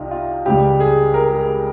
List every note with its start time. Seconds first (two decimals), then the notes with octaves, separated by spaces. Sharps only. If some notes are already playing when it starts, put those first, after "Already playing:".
Already playing: C2 C3 D#4 F4 G4
0.11 F4
0.46 C#2 C#3 G3 G4
0.80 G#4
1.14 A#4
1.32 G#4
1.49 G4